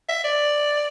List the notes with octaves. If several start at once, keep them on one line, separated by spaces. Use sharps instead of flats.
E5
D5